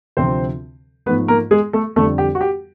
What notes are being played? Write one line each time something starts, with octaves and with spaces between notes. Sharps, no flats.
D2 C3 F3 C4 C5
G#2 F3 A3 B3 B4
A#3 A#4
G#3 G#4
A3 A4
F2 D3 G3 A3 A4
G4
F#4
G4